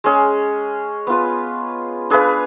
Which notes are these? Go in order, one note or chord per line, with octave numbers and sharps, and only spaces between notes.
G#3 C#4 G#4
B3 F4 B4
D4 G#4 B4 F5